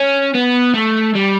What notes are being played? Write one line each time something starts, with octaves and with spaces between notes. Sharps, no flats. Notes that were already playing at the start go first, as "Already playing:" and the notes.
Already playing: C#4
B3
A3
G3